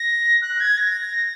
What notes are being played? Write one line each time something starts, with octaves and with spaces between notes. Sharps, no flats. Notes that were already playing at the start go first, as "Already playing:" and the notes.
Already playing: A#6
F#6
G#6
A#6